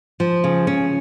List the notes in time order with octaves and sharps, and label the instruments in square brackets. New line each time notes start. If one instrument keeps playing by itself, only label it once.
[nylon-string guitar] F3
C#3
C#4